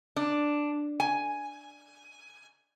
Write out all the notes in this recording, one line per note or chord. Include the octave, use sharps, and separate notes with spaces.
D4
G#5